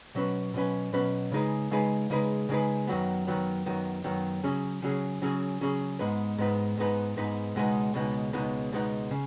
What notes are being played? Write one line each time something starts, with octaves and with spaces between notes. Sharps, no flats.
B2 F#3 C#4 B4
B2 F#3 C#4 B4
B2 F#3 C#4 B4
C#3 G#3 D#4 G#4 B4
C#3 G#3 D#4 G#4 B4
C#3 G#3 D#4 G#4 B4
C#3 G#3 D#4 G#4 B4
F#2 D#3 F#3 B3
F#2 D#3 F#3 B3
F#2 D#3 F#3 B3
F#2 D#3 F#3 B3
C#3 F#3 C#4 G#4
C#3 F#3 C#4 G#4
C#3 F#3 C#4 G#4
C#3 F#3 C#4 G#4
G#2 G#3 B3 D#4 B4
G#2 G#3 B3 D#4 B4
G#2 G#3 B3 D#4 B4
G#2 G#3 B3 D#4 B4
C#2 B2 G#3 B3 D#4
C#2 B2 G#3 B3 D#4
C#2 B2 G#3 B3 D#4
C#2 B2 G#3 B3 D#4
C#3